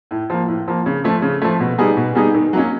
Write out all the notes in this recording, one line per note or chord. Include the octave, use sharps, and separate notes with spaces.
A2
F3 A#3
A2
F3 A#3
C#3
F3 A3
C#3
F3 A3
B2
G3 B3 D#4 G#4
B2
G3 B3 D#4 G#4
D#3
F#3 A#3 C#4